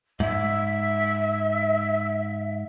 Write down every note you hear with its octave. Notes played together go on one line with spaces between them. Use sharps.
G#2 E5